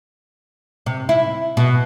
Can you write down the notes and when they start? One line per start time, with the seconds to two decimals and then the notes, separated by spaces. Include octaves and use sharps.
0.86 C3
1.09 E4
1.57 B2